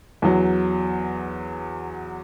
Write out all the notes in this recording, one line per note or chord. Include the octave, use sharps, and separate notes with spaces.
E2 F#3